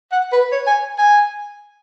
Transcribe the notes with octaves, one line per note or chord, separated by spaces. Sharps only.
F#5
B4
C#5
G#5
G#5